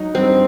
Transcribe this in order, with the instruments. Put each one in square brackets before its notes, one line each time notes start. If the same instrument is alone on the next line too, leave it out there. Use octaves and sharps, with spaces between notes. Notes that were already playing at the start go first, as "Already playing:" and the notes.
Already playing: [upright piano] F#3 D#4
[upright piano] G2 [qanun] C4